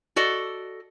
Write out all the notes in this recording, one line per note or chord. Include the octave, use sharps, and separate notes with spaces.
F#4 A4 D5 D#5